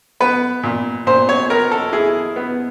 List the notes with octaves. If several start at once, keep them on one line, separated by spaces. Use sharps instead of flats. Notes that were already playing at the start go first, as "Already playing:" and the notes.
B3 B4
A#2
A#2 C5
C#5
B3 A#4
A4
E4 G#4
B3